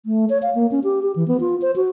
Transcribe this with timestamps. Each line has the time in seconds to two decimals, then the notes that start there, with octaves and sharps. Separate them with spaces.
0.06 A3
0.30 C#5
0.43 F5
0.55 A#3
0.71 C#4
0.84 G4
1.03 G4
1.16 E3
1.28 B3
1.40 F4
1.62 C5
1.76 F#4